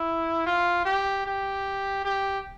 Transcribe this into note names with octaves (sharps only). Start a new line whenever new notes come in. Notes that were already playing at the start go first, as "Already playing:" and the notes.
Already playing: E4
F4
G4
G4
G4